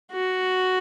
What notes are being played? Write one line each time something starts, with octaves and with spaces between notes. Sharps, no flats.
F#4